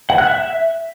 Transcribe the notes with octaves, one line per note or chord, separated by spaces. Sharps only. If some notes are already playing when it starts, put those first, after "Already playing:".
F#5
F#6
E5